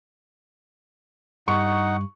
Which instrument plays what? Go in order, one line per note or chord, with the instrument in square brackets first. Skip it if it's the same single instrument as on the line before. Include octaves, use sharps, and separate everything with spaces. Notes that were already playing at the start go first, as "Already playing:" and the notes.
[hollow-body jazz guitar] G2 [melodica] D#4 F#5 [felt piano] C#6